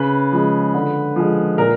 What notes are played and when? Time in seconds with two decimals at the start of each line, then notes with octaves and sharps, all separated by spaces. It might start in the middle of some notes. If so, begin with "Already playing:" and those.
Already playing: C#3 B4
0.32 F3 G#3
0.74 D3
1.16 F3 G#3
1.58 A#2 A#4